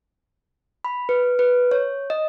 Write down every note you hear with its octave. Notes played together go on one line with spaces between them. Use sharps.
B5
B4
B4
C#5
D#5